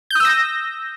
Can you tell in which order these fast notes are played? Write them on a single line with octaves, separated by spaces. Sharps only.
G6 D#6 E6 A#6